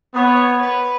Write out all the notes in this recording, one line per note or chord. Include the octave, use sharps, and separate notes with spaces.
B3 C#5
B4